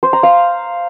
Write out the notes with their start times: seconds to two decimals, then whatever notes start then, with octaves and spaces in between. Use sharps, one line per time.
0.03 C5
0.13 A#5
0.23 F5